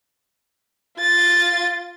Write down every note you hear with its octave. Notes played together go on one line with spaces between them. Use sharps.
F4 A6